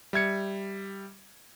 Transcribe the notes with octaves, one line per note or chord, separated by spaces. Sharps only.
G3 E5 G#6 C#7